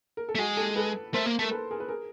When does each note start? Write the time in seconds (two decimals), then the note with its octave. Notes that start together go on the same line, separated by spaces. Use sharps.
0.17 A#4
0.29 A4
0.35 A3
0.38 G#3 F#4 G#4
0.57 G4 A4
0.76 A4 B4
1.13 A3 A#4 C5
1.26 A#3
1.39 A3 A#4
1.51 A4 B4
1.71 G#4 A#4
1.80 B4
1.89 G#4 A#4